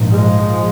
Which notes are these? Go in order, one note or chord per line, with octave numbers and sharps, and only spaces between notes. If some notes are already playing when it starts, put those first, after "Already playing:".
Already playing: A#1 G#2
F3 G#3